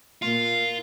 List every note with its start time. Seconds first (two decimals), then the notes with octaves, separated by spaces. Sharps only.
0.22 A#2 F4